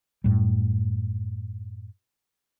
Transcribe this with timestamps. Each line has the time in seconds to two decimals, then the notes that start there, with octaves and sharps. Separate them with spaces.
0.24 F#2 A2 G3